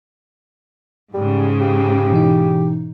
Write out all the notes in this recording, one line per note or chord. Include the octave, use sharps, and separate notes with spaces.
G#2 C#3 G3
G4
B2 E3 D#4